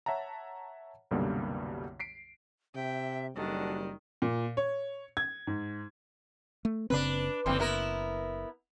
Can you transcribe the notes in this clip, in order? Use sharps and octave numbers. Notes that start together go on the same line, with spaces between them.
C#5 E5 F#5 A5 A#5
C2 F#2 B2 D3 G3 A#3
B6 C7 D7
C3 E5 G5
F#1 D#3 G3 D4 F#4 A4
A#2
C#5
G#6
G#2
A3
F#1 C#3 C4 D4 B4
F#1 D3 E3 C4
B3 E4 A#4